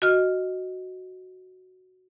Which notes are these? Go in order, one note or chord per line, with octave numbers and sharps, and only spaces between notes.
F#4 D#5 F6